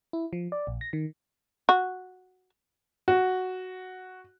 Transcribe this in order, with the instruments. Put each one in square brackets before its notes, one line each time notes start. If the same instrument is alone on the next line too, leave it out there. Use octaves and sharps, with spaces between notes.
[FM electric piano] E4
F3
D5
A#1
A#6
D#3
[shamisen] F#4
[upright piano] F#4